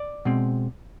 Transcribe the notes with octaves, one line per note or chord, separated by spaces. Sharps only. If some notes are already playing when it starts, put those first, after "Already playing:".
Already playing: D5
B2 G#3 C4